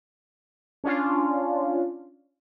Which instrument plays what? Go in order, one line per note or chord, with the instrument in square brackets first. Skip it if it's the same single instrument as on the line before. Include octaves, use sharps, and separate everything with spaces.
[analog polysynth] C#4 D4 F4